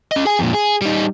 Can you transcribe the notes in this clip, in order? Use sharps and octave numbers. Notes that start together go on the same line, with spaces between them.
C#4 D#5
G#4 G#5
F2 A#2
G#4
G3 D#4